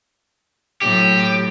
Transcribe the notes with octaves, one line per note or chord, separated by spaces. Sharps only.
A2 F#3 G4